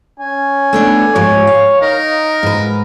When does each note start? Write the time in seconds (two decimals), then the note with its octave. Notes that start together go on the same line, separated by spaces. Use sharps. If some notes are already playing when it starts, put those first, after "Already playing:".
0.20 C#4 G#5
0.73 A3 B3 D4
1.15 G#2 F3 G4 C#5
1.47 F5
1.82 D#4 A#4
2.43 G#2 B4